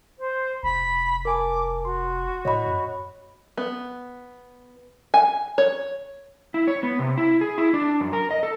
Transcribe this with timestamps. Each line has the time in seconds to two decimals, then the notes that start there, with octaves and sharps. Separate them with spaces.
0.19 C5
0.63 F1 B5
1.25 A#4 G#5 A5 D6
1.85 F#4 C6
2.45 A2 C#5 D#5 B5
2.66 F#2
3.57 B3
5.14 G#5
5.58 C#5
6.54 E4
6.68 C#5
6.83 B3
6.99 C3
7.18 E4
7.41 G#4
7.58 E4
7.74 D4
8.00 F#2
8.13 A#4
8.31 D#5
8.43 A4